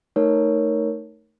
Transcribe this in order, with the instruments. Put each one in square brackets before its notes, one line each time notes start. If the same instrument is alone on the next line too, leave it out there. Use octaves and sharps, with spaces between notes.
[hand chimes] A3 D#4 A#4 C#5